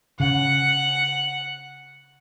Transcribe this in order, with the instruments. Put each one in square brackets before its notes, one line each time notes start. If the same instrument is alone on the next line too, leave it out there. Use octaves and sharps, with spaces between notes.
[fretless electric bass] C#3 [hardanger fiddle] F#5